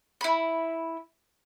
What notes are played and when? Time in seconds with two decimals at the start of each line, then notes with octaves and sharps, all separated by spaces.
0.21 E4 B5